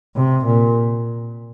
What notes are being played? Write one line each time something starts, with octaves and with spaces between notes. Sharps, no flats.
C3
A#2